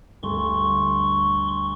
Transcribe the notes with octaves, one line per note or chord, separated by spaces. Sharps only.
D2 G2 A4 C6 C#6